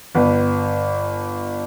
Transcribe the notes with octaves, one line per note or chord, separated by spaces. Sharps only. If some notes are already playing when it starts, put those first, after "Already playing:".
G1 B4